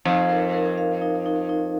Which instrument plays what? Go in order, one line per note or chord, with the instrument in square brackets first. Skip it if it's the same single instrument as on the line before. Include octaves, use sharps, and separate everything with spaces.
[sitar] F2 [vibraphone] D#4
[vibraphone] A#4
A#4
F5
D#4
D#4
D#4